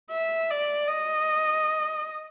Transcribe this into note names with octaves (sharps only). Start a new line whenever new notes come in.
E5
D5
D#5